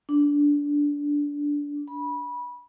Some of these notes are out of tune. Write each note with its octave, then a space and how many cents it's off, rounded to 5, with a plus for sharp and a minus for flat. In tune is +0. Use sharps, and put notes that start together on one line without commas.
D4 -15
B5 -20